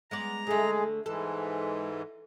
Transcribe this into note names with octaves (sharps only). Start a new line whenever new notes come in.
G#3 B3 D5 A#5
D3 G#3 A3 G#4
G#2 E3 G#3 A4